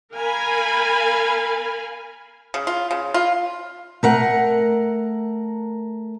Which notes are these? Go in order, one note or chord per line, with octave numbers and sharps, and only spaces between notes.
A#4 F5 G#5 B5
C#3
F4
C#3
F4
A3 A#4 F#5